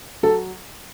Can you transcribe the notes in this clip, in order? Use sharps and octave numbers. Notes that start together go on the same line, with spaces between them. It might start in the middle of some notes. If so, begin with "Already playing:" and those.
F#3 A4